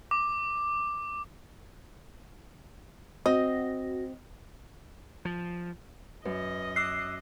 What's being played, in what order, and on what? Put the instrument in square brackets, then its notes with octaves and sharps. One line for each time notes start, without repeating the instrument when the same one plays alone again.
[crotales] D6
[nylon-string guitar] C4 [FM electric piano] F#4 A#6 [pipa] D#5
[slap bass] F3
[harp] F#2 [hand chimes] B4 [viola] D#5
[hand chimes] D6 E6 F#6 [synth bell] C7